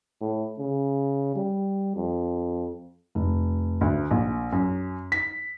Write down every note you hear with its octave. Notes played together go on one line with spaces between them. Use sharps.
A2
C#3
G3
F2
F1
D2
A#1
F#2
B6